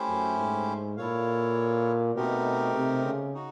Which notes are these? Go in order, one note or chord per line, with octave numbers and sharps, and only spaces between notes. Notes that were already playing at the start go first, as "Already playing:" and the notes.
Already playing: A3 C#4 E4 G4 C5
F#2
G#2
A#2 E4 A4 C#5 F5
B2 A3 C4 D#4 G4 A#4
C3
C#3
D#4 F#4